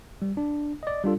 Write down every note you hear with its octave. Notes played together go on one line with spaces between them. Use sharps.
G3
D4
D5 D#5
G3 D4 F4 A4